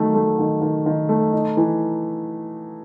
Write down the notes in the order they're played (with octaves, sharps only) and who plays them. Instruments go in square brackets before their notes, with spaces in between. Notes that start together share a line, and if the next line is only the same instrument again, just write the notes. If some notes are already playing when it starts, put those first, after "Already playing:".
Already playing: [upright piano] D#3 F#3 A3
A3
D#3
D#3
D#3
A3
D#4
E3